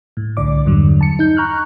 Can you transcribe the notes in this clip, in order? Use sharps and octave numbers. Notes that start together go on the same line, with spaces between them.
A2
C2 D3 D5 D6
E2 G2 D3 F#3
A5 C#7
D#4 G6
A#5 C#6 F6 F#6